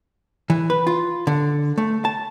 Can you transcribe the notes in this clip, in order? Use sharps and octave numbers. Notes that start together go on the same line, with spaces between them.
E3
B4
F4
D3
A3
A5